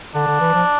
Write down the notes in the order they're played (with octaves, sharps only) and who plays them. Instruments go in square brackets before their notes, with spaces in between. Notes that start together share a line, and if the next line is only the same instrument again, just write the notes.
[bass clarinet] D3 [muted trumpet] D4
[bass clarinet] D3
E3
F3